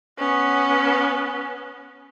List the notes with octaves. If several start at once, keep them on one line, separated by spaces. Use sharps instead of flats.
B3 C#4